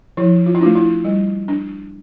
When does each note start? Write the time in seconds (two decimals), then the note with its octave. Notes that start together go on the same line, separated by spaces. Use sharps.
0.17 F3 E4
0.46 F4
0.55 E4
0.61 A3 D4 F4
0.75 E4
1.04 G3
1.48 D4